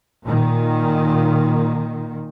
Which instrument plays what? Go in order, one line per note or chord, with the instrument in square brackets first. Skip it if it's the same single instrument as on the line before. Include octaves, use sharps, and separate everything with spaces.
[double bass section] A#2 D#3